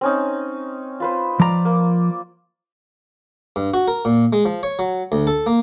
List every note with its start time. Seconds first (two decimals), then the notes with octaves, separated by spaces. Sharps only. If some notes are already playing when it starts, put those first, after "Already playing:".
0.01 C4 C#4 D#4
1.00 F4 B4 C5
1.40 F3 D5 A#5
1.65 A#3
3.56 G2
3.74 F#4
3.88 A#4
4.05 A#2
4.33 G#3
4.45 F3
4.63 C#5
4.79 F#3
5.12 D2
5.27 A4
5.47 A#3